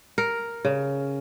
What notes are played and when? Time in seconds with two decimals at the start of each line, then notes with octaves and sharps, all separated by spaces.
0.18 A#4
0.65 C#3